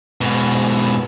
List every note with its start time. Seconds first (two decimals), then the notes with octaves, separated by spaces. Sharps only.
0.21 G#2 B2